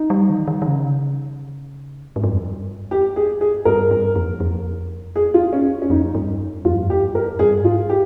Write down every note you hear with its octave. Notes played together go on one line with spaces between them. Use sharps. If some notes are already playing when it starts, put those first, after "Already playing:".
Already playing: D#4
G3
D#3
D#3
D#3
C#3
G#2
G2
F2
G2
G4
G#4
G#4
G2 A#4
G2
F2
F2
G#4
F4
C#4
C#4
F2 D#4
G2
F2 F4
G2
F2
G4
G2
A#4
G2 G#4
G#2
F4
G4